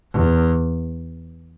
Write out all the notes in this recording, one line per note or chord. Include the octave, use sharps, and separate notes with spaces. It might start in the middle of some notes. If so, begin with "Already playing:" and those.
E2